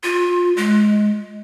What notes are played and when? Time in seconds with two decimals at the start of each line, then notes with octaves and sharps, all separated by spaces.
0.04 F4
0.57 G#3